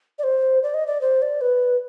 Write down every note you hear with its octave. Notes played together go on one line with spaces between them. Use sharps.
D5
C5
D5
D#5
D5
C5
D5
B4